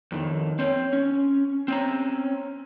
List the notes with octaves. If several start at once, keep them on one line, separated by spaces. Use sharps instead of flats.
F2 D#3
C4 C#5
C#4
C4 C#4 A#5